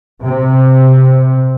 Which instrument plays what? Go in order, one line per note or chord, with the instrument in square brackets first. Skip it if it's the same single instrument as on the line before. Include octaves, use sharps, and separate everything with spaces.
[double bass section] C3